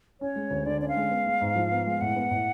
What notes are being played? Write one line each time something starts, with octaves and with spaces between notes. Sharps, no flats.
C#4 C#5
G#3
D2
D3 D5
C#4 D5
F5
G#3
B3
G#3
G#2
F3
B3
G#3
A2 F#5
B3
A2